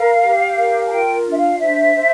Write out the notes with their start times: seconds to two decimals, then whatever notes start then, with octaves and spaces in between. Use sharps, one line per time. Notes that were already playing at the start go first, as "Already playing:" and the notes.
Already playing: A#4 F5
0.22 G4
0.57 A#4
0.86 A5
0.90 F4 G5
1.26 D4
1.32 E5
1.37 F5
1.60 C5 E5
1.95 C5